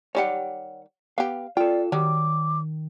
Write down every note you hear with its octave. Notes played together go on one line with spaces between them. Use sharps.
D#3 G3 G4 C#5 F#5
B3 G4 F5
F4 A4 D5 G5
D#3 F#3 G3 D6